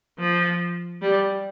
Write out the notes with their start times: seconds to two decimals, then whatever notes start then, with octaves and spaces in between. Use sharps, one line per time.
0.19 F3
1.02 G3